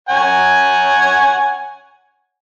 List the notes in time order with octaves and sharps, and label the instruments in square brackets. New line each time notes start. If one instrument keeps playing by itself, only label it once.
[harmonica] C#5 F#5 G#5